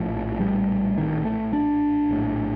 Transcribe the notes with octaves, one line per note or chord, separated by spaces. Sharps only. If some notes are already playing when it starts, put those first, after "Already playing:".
Already playing: A#1 A2 F3
G3
D#3
A3
D4
A#1 A2